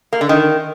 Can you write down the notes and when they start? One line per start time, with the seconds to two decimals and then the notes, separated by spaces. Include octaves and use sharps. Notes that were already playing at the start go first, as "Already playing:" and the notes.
0.13 A#3
0.21 D3
0.29 D#3